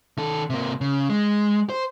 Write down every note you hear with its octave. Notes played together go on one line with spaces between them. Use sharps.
D#3 A4
C3 A#3
C#3
G#3
C5